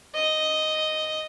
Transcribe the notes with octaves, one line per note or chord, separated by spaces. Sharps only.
D#5